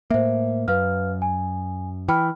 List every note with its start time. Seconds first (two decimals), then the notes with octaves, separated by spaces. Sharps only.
0.10 A2 A#3 C5 E5
0.68 F#2 B4 F5 F6
1.22 G#5
2.08 E3 G5 B5 F6